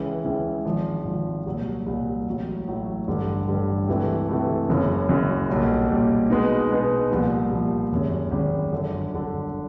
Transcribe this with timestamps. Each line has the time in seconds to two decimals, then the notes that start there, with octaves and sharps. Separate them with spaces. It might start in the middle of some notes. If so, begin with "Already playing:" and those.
Already playing: C#2 C#3 E3
0.25 C#2 C#3 E3
0.65 G#1 G#2 F3
1.05 G#1 G#2 F3
1.46 C2 A#2 F#3
1.86 C2 A#2 F#3
2.27 A1 A2 F#3
2.67 A1 A2 F#3
3.07 A1 G2 D3
3.48 A1 G2 D3
3.88 C#2 C3 E3 A3
4.28 C#2 C3 E3 A3
4.69 F#1 F#2 C#3
5.09 F#1 F#2 C#3
5.49 B1 A#2 G3
5.90 B1 A#2 G3
6.30 B2 G#3 B3 D#4
6.70 B2 G#3 B3 D#4
7.11 C2 A#2 F3
7.51 C2 A#2 F3
7.92 G#1 F#2 C#3
8.31 G#1 F#2 C#3
8.72 G1 F#2 D3
9.12 G1 F#2 D3